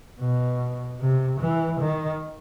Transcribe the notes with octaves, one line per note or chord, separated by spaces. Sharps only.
B2
C3
E3
D#3